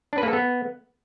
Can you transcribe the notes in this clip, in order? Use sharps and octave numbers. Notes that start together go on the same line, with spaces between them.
D4
B4
A#3
A4
B3